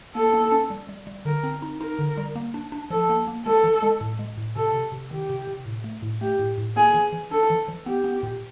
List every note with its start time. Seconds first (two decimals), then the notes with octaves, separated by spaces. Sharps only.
0.15 A#3 A4
0.34 A#3
0.52 C#4
0.70 G3
0.89 G3
1.07 G3
1.25 D3 A#4
1.44 C4
1.62 D#4
1.81 D#4 A#4
1.99 D3
2.17 G3
2.36 A#3
2.54 D4
2.72 D4
2.90 F3 A4
3.10 A#3
3.27 A#3
3.45 G#3 A4
3.64 E3
3.82 G#3
4.01 A2
4.19 G#3
4.37 A2
4.56 C3 A4
4.75 C3
4.92 C3
5.11 D#3 G4
5.29 C3
5.47 C3
5.66 A2
5.84 A3
6.02 A2
6.21 A3 G4
6.39 A2
6.58 A2
6.76 A#3 G#4
6.95 E3
7.13 E3
7.31 D4 A4
7.50 E3
7.68 E3
7.86 B3 G4
8.04 B3
8.23 A#2